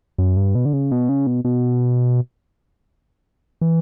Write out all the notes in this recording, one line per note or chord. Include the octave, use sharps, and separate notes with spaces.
F#2
G2
B2
D3
C#3
B2
C#3
B2
B2
E3